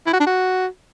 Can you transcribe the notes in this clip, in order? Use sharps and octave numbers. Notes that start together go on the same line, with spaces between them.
E4
F#4
D4
F#4